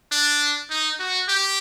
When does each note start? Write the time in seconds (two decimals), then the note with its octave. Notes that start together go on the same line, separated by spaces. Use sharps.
0.12 D4
0.70 D#4
1.00 F#4
1.29 G4